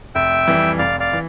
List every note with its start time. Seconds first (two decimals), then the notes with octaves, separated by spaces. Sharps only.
0.15 F1 E5 G5
0.47 F2 E3 G3
0.78 F1 D5 F5
1.00 D5 F5
1.13 E3